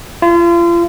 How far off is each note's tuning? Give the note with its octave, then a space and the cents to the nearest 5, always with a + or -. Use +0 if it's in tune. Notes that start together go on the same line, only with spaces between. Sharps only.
F4 -35